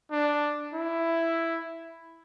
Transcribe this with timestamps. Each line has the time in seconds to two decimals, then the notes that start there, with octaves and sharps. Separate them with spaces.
0.11 D4
0.74 E4